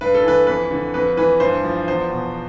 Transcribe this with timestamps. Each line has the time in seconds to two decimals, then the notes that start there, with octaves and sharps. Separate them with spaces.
0.01 G2 B4
0.14 A4
0.24 E3 B4
0.47 F2 B4
0.71 D3
0.94 F2 B4
1.17 E3 B4
1.40 G2 C5
1.64 F3
1.87 E2 C5
2.10 B2